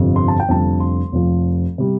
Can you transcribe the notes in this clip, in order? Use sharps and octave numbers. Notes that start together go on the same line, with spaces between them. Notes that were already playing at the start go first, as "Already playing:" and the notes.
Already playing: G1 F2 C3
C6
A5
G5
F1 F2 D3 G3 A5
C6
F1 F2 F3
C3 G3